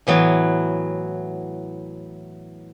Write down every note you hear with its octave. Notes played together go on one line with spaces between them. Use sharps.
A2 E3 F#3 B3